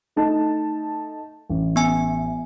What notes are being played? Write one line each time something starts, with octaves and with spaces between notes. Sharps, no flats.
A3 D#4 A5
A1
B3 G#5